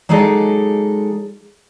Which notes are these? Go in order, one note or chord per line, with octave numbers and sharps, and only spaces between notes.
F#3 G#3 D#4 G#4 A4 D5